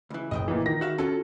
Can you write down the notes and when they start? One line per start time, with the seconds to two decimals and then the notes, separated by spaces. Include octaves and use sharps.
0.10 C#2 E3
0.31 F#1 D#5 E5 G5
0.48 A#2 E3
0.66 D#3 A#6
0.81 F#4 E5 F5
0.98 C#4 F4 F#4 A4